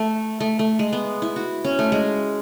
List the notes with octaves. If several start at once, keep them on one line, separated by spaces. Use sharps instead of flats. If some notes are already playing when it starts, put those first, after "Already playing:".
Already playing: A3
A3
A3
G#3
B3
E4
F#4
C#4
A3
G#3